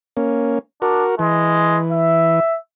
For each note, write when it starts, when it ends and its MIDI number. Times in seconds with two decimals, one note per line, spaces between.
0.17 0.59 58
0.17 0.59 61
0.82 1.04 62
0.82 1.15 66
0.82 1.15 70
1.19 2.40 52
1.19 1.79 56
1.92 2.58 76